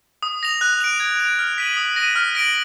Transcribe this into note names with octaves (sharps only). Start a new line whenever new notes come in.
D#6
A#6 F7
F#6
D7 F7
G#6
D7 F7
F6
B6 D#7 F#7
D#6
A#6 D#7
F6
A#6 D7 F#7